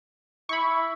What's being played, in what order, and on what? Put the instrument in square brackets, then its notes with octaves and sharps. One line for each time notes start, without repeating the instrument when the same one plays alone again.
[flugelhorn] E4 [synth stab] B5 C#6